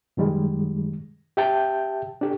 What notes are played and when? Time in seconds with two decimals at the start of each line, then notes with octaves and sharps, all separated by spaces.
0.17 F#2 D#3 G3 G#3
1.37 G4 E5 G5 A5 G6
2.21 D4 G4 A4